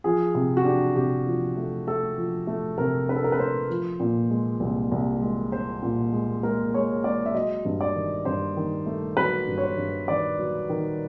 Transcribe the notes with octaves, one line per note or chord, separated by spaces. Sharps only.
F3 G#4
C3
F#4
D4 G4
C3 G4
F3
A3
A3 A4
F3
A3
C3 A#4
D4 B4
A4
A#4
B4
A3 C5
F3
A#2
G#3
C2
C2
G#3
G#3 C5
A#2
G#3
G#3 A#4
G#3 C#5
G#3 D5
E5
F#3 D#5
G2
D5
D#3
G2 C5
D#3
A3
F#3 B4
G2
C#5
C5
G2
D#3 D5
F#3
D#3